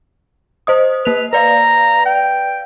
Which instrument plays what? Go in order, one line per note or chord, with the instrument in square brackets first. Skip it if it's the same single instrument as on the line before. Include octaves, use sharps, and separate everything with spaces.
[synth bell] C5 D#5 D#6
[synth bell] A#3 F7 [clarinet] B4
[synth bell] B4 D5 F5 [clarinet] A#5
[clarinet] G5